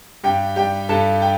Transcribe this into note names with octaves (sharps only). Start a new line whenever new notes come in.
G2 G4 G5
G3 G4 G5
G2 A4 A5
G5